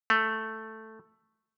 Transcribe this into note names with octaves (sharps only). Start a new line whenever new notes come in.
A3